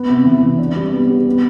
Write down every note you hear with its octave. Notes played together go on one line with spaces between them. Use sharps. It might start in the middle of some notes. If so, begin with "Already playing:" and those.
Already playing: B3
C3
E3
C3
D4
G3
B3
G4
B3